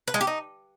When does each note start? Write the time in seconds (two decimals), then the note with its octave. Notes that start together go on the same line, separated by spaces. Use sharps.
0.08 B4
0.14 G#3
0.21 G4
0.27 D#4